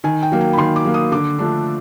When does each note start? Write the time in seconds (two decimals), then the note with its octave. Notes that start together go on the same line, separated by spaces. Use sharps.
0.04 D#3 G#5
0.23 G5
0.32 F#3 A#3
0.41 G5
0.53 B5
0.58 D#3 C6
0.76 D6
0.84 F#3 A#3
0.94 D#6
1.12 D3 D6
1.39 F3 A3 D4